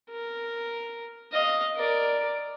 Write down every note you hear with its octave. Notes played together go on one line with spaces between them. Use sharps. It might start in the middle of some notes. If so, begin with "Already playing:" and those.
A#4
D#5 F5
A#4 D5